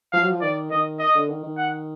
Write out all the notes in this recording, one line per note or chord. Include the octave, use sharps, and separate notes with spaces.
F3 F5
F#3
F3
D#3 D5
D#3 D#5
D#5
D3
D#3
D#3
F#5